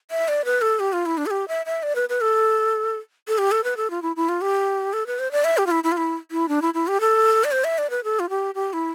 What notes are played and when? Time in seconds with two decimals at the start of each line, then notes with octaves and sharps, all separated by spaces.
0.11 E5
0.28 D5
0.45 B4
0.62 A4
0.80 G4
0.93 F4
1.06 E4
1.18 D4
1.26 A4
1.31 G4
1.48 E5
1.66 E5
1.83 D5
1.95 B4
2.09 B4
2.21 A4
3.28 A4
3.38 G4
3.52 A4
3.64 B4
3.77 A4
3.90 F4
4.02 E4
4.16 E4
4.29 F4
4.41 G4
4.93 A4
5.07 B4
5.19 C5
5.31 D5
5.44 E5
5.58 G4
5.67 F4
5.71 E4
5.84 E4
5.92 F4
5.97 E4
6.31 E4
6.49 D4
6.62 E4
6.74 E4
6.88 G4
7.00 A4
7.44 D5
7.52 C5
7.64 E5
7.78 D5
7.90 B4
8.04 A4
8.20 F4
8.30 G4
8.55 G4
8.73 E4